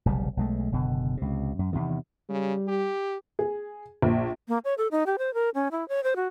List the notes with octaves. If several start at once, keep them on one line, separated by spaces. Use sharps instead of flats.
F1 B1 C#3 G3
B1 G#3 A3
F#1 B2 D3
C#2 C3
F#2
E2 C3 D#3
C#3 G3
G4
G#4
A#1
A#3
C#5
A4
D#4
G4
C5
A#4
C#4
E4
C#5
C5
F#4